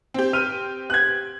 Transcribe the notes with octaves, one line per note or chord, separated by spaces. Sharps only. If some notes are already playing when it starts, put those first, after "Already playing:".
C4 G4
F6 D#7
F#6 G#6